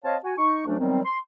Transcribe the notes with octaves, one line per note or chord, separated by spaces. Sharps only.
C4 C#5 D#5 F5 A5
F#4 G#5
D#4 C#6
D2 F#3 A3 C#4 D4
D#3 F#3 G3 B3 C4
C6